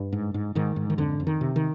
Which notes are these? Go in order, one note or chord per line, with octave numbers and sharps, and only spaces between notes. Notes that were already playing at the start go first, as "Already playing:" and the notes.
Already playing: G2
G#2
G#2
G#2 D#3
G#2
D#3
F2 D3
F2
D#3
C3
D#3